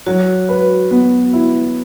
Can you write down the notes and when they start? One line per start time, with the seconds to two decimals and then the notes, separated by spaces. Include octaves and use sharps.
0.06 F#3 F#4
0.49 B4
0.91 B3
1.33 E4